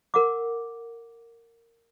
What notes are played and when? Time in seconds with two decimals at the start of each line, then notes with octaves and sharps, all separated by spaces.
0.14 A#4 F#5 D6